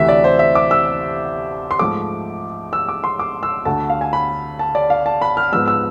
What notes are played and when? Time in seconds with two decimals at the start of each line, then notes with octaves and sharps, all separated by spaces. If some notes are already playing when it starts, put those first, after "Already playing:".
Already playing: D2 C3 E3 A3 E5
0.09 D5
0.24 C5
0.39 E5
0.55 D6
0.71 E6
1.71 C6
1.79 G#2 F3 A3 D6
2.73 E6
2.89 D6
3.04 C6
3.20 D6
3.43 E6
3.65 D2 D3 A3 A5
3.90 F5
4.01 G#5
4.13 B5
4.59 A5
4.75 D5
4.90 F5
5.06 A5
5.22 B5
5.37 F6
5.53 G#2 F3 B3 E6
5.68 E6